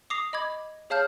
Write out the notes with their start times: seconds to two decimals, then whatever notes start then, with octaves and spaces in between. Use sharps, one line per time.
0.10 D6 D#6 A#6 C7 F7
0.33 D#5 B5 D6 G#6
0.90 G#4 C#5 F5 A5 F6 G6